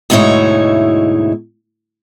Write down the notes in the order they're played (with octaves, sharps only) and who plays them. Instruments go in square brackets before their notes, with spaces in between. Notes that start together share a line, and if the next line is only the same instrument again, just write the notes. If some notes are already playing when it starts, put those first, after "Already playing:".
[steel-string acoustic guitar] D2 G#2 B2 D#4 E4 C#5